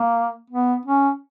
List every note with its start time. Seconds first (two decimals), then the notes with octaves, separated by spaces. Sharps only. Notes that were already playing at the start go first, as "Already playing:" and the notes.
Already playing: A#3
0.50 B3
0.86 C#4